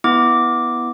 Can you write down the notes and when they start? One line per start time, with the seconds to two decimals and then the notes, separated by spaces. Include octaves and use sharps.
0.04 B3 E4 D6